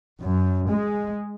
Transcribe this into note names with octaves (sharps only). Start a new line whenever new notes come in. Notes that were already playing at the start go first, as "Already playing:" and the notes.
F#2
G#3